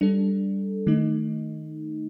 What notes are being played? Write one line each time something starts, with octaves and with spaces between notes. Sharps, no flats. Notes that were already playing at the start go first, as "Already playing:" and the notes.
G3 D4 A4
D#3 A3 D#4